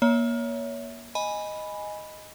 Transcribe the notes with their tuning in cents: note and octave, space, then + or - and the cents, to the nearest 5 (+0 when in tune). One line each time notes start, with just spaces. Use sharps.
A#3 +25 C#5 +25 E5 -10
D#5 +0 G#5 +0 B5 +0